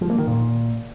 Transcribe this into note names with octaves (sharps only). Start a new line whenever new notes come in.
F3
A#3
D#3
A#2